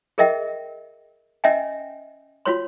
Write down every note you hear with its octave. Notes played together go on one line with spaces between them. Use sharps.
G#4 A#4 D#5 E5 G5
C#4 D#5 E5 G5 G#5
F4 F#4 C#5 C6